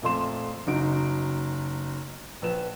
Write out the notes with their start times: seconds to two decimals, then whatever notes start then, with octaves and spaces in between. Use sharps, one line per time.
0.02 F2 A#2 A3 C6 E7
0.67 F#1 D#4 F#4 D7
2.42 A#1 B4 E7